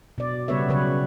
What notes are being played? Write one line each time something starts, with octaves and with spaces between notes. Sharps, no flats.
B2 D5
C#3 G3 B3 B4 C#5 E5
C#3 F#3 B4 C#5